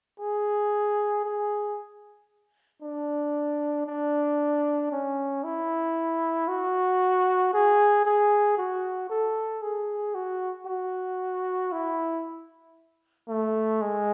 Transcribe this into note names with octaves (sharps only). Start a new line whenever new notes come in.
G#4
G#4
D4
D4
C#4
E4
F#4
G#4
G#4
F#4
A4
G#4
F#4
F#4
E4
A3
G#3